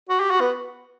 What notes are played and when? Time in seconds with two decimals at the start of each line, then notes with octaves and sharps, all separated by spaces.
0.09 F#4
0.20 G4
0.30 F#4
0.40 B3